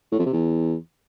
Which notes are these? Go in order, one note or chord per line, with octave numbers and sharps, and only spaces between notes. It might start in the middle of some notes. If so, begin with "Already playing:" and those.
A2
F2
C3
E2